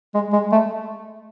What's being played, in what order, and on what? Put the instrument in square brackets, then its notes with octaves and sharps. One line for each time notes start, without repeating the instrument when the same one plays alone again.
[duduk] G#3
G#3
A3